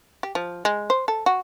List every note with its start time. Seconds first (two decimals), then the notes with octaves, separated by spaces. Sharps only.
0.23 G4
0.35 F3
0.65 G#3
0.90 C5
1.08 A4
1.26 F#4